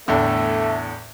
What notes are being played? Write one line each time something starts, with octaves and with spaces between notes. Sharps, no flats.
E2 A2 D3 A3